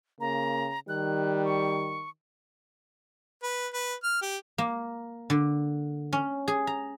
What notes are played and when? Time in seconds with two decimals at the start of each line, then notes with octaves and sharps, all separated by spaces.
0.20 C#3 A#3 A#5
0.89 D#3 G3 F#6
1.45 C#6
3.43 B4
3.73 B4
4.03 F6
4.22 G4
4.58 A#3
5.30 D3
6.13 C#4
6.48 G#4
6.67 A#5